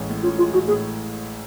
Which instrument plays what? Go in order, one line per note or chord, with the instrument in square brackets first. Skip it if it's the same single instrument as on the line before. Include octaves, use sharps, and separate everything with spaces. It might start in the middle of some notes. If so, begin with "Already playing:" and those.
Already playing: [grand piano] A1 G#3 C#4
A2
[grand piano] C#4 [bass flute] F4
[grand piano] G#3 [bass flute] F4
[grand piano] A1 [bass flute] F#4
[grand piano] A2 [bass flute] G#4